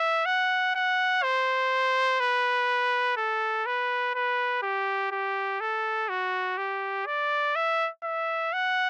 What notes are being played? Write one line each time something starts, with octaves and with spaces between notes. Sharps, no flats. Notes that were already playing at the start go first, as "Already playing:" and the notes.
Already playing: E5
F#5
F#5
C5
B4
A4
B4
B4
G4
G4
A4
F#4
G4
D5
E5
E5
F#5